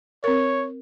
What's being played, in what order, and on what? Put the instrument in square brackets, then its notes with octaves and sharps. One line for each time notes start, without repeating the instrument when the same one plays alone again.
[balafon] C4 A#4 [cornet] C#5